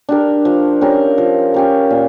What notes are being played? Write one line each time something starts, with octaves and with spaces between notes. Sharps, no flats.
D4 G4 A#4
F3
C#4 G4 A#4
F3
C#4 G4 A#4
A#2